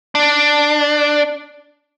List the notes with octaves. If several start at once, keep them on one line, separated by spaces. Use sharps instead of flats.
D4